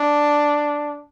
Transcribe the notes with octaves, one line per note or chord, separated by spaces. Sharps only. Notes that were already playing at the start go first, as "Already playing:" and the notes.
Already playing: D4